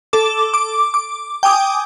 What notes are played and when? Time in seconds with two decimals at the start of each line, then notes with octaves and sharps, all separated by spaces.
0.13 A4 D6
0.54 D6
0.94 D6
1.43 G5 G#5 D6 D#6